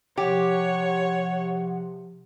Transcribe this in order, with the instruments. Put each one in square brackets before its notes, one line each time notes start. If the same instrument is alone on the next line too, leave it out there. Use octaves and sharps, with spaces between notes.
[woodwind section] C3 F3 [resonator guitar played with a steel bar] G4 [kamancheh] C#5 [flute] F#5